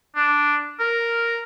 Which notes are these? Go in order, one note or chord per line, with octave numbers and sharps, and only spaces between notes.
D4
A#4